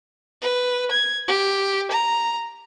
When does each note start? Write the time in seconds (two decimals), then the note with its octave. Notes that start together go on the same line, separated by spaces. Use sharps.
0.42 B4
0.91 G#6
1.27 G4
1.91 A#5